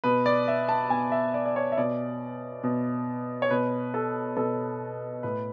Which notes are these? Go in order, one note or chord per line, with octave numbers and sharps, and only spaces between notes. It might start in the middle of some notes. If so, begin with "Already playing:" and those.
B2 B4
D5
E5
A5
B2 G#5
E5
D5
D5
C#5
E5
B2 D5
B2
C#5
B2 B4
A4
B2 A4
A2 B4